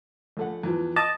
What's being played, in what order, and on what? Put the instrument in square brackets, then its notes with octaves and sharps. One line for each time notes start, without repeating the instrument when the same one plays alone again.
[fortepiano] A#1 A3 F#5
E2 E3 F3
[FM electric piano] D#5 A5 [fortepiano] D6